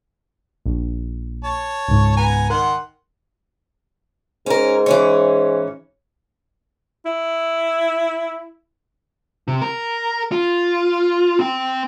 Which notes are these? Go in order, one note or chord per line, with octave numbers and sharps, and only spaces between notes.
A#1
C#5 A5
C#2 G#2
B3 G#5 A#5
D#3 A#4 F#5 C6
G#2 C#4 A#4
E3 C#4 C#5
E4
C3
A#4
F4
C4 G5